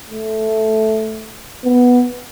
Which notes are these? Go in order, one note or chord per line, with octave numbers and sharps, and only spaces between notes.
A3
B3